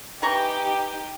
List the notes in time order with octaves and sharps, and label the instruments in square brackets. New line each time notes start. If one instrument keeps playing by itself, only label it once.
[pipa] E3 A#5 C#6 [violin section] D#4 G4